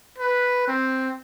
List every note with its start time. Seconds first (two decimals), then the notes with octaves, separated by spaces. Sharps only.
0.18 B4
0.67 C4